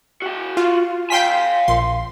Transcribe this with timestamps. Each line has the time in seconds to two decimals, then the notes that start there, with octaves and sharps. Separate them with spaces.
0.22 F#4 G5
0.57 F4
1.10 F5 G5 G#5 C6 B6
1.68 A#1 C6